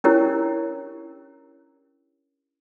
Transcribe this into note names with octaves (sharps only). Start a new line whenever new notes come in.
C#4 D4 E4 G4 A#4 C#5